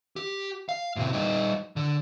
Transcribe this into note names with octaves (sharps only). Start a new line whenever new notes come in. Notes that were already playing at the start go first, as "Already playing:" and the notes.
G4
F5
A2 C3
G3 D#4
D3